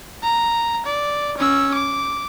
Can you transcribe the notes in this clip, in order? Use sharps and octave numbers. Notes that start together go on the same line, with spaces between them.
A#5
D5
C#4 E6
D6